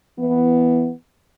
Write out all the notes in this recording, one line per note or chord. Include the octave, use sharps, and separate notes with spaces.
E3 B3